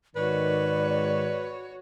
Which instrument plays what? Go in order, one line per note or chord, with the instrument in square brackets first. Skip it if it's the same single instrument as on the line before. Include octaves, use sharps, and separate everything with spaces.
[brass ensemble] G#2 D#3 [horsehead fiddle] F#4 C#5 [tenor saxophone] B4 [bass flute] D5